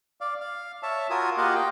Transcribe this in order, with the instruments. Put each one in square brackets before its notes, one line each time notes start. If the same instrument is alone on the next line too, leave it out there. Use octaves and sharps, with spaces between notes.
[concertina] D5 F5
F5
C#5 E5 A5
F4 F#4 A#4 G#5 D#6
A#3 F4 G4 D#5 F5 F#5
D#5 G5